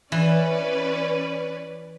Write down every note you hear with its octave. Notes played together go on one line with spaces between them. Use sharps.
E3 C#4 B4 D5